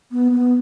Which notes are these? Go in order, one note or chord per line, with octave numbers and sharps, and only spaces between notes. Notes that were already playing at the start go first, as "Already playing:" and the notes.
B3
B3